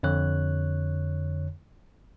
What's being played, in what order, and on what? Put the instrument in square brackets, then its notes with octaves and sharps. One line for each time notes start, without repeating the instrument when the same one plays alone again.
[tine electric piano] F2 D3 C#5 F#6